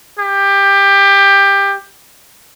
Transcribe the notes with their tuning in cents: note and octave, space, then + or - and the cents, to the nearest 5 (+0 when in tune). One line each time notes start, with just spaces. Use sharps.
G4 +20